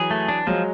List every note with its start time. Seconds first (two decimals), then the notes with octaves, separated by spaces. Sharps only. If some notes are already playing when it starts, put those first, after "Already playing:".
Already playing: E3 F#3 G#4
0.11 A3
0.28 D4
0.47 F3 F#3 G#3